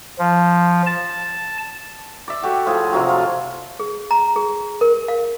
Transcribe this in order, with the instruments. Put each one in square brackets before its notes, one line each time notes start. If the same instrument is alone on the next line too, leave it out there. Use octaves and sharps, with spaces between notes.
[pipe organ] F3
A5
[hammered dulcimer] D5 E5
F#4 G4 A4
A2 F3 G#4
C3 F3 F#3 F#4
F4
[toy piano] G#4
A#5
G#4
A#4
F5